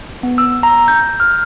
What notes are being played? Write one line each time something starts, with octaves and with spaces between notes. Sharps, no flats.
B3
E6
A#5
G6
F6